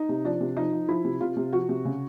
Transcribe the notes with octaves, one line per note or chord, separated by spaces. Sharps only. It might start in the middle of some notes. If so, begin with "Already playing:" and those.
Already playing: D#4
C3
F3 D4
C3
F3 D#4
F3
F3 E4
C3
C3 F4
C3
F3 F#4
C3
C#3